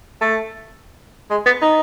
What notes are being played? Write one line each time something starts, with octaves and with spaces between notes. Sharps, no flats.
A3
G#3
B3
D#4